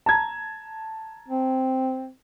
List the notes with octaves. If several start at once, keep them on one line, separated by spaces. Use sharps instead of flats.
A5 A#5 G#6
C4